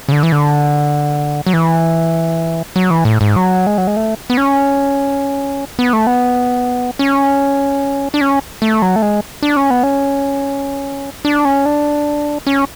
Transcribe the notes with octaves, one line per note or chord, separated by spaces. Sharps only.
C#3
D3
E3
D3
F#3
E3
F#3
E3
A2
G#2
F#3
G#3
F#3
G#3
A3
B3
C#4
B3
A3
B3
C#4
D4
C#4
A3
F#3
A3
G#3
D4
C#4
B3
C#4
D4
C#4
D4
C#4